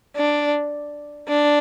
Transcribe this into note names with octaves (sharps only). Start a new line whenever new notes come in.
D4
D4